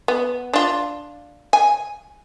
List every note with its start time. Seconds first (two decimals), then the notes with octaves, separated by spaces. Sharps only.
0.08 B3
0.54 D4 F4
1.53 G#5